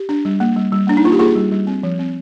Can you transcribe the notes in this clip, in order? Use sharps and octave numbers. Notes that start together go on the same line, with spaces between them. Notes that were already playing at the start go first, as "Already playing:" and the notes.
Already playing: G4
D4
G3
A#3
G3
G3
A#3 D4
D#4
A#3 F4
G4
A#3 F4 G#4
G3
G3
C4
F3
C4